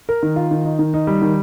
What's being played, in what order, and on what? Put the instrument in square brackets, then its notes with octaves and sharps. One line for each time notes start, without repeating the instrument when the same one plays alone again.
[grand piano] A#4
D#3
F4
D#3
D#4
D#3
D#4
G3
D#3